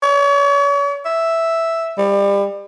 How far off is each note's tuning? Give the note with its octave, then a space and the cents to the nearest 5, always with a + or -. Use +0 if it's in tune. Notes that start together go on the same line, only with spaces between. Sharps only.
C#5 +40
E5 +0
G3 +30